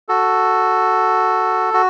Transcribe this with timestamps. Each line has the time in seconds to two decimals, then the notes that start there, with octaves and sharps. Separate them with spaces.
0.08 F#4 A4
1.74 F#4